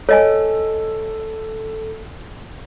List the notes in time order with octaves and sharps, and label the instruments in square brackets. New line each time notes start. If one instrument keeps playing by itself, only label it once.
[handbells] A4 [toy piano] C#5 D#5 G#5